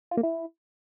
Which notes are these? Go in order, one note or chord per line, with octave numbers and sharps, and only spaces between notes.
F4
A#3
E4